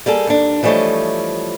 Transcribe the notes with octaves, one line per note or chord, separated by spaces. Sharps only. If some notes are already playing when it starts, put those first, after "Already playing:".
G3 A#3 G#4 A4
D#2 D4
E3 F3 G3 A3 C#5 D#5